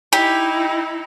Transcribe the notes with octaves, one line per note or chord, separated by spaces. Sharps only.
D#4 E4 G4